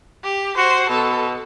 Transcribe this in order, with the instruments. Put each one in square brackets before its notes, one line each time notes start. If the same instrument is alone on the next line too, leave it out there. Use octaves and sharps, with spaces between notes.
[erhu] G4
[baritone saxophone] F#4 [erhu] C5
[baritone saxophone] B2 [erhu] A4